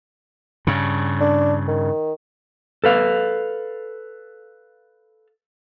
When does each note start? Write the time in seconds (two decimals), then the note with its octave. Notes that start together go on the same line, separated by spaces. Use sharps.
0.67 G2 C#3
1.21 D4
1.68 D#3
2.84 A4 B4 F5